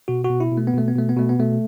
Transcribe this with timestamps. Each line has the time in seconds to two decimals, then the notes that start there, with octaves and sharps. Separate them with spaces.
0.08 B2 F#4
0.24 F#4
0.30 B2
0.40 E4
0.52 B2
0.57 A3
0.67 B3
0.73 B2 A3
0.88 B3
0.96 B2 A3
1.09 B3
1.17 B2 A3
1.29 B3
1.39 B2 A3